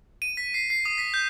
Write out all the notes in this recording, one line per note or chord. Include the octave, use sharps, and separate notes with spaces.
D#7
B6
C7
C7
D#6
B6
G6